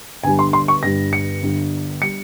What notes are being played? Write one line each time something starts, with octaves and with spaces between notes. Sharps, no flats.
G1 G2 G3 G#5
C6
C6
C#6
G1 G2 G3 A#6
C#7
G1 G2 G3
G3 C#7